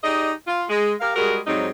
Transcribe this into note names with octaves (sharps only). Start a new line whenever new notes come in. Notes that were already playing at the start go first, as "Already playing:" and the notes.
D#4 G4 G#4 D5 D#5
F4
G#3
G4 A#4 F5
G3 G#3 F#4 G#4 A#4
G#2 F#3 G3 C4 D#4